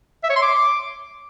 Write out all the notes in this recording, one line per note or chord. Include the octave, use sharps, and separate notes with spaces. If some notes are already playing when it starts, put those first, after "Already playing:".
E5
C#5
C6
D6